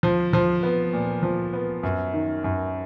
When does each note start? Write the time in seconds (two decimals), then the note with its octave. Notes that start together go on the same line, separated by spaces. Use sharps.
0.03 F3
0.33 F3
0.63 B3
0.93 A#2
1.23 F3
1.53 B3
1.83 F#2
2.13 D#3
2.44 F#2